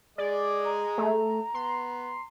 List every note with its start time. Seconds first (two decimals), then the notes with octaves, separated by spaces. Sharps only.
0.18 G#3 G#4 D5 D#5
0.65 A#5
0.98 A3
1.54 B3 C6